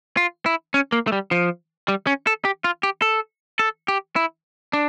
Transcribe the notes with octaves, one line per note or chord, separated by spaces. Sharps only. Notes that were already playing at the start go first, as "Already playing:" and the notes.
F4
E4
C#4
A#3
A3
G3
F3
G3
C#4
A4
G4
F4
G4
A4
A4
G4
E4
D4